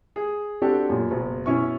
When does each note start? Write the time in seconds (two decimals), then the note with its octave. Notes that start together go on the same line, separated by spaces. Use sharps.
0.16 G#4
0.62 C4 D4 F#4 G4 A4
0.89 F#2 A#2
1.11 F#1 B2
1.46 B2 C#4 E4 C#6